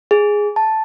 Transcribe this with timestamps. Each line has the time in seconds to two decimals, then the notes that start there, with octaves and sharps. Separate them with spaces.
0.11 G#4
0.56 A5